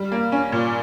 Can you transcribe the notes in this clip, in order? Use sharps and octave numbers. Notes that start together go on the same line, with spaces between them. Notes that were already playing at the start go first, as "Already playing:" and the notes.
Already playing: G3
A#3
C#4
A#2